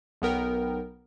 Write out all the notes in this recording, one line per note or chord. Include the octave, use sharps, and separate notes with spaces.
B1 B3 A#4 G5